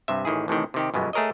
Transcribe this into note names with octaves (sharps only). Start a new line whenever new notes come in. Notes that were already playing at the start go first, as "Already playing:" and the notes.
G2 C3 E5
A1 D#3 E4 G#4
A1 A2 C3 D#3
C3 D#3 G4
G1 F#2 B2 G#3 B3
A3 G#4 A#4 C#5 D#5